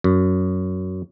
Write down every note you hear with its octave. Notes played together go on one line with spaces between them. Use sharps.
F#2